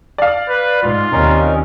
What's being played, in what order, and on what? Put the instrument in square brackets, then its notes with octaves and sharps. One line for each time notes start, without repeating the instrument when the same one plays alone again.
[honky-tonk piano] D5 F5
[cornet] B4
[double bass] G#2 [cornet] F4
[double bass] D#2 C3 [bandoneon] C#4 D#4 A#4